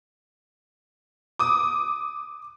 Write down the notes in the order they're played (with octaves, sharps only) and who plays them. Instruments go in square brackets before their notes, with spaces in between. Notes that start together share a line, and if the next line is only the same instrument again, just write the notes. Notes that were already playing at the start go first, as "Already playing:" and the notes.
[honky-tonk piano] D6 D#6